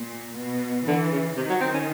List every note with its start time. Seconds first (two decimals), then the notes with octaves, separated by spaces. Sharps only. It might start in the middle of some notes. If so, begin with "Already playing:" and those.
Already playing: A#2
0.38 B2
0.87 D3 E3
1.12 C#3
1.37 C3 D#3
1.49 F#3
1.61 C4
1.74 C#4